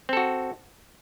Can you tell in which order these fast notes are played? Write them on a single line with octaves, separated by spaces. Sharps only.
C4 A4 F#4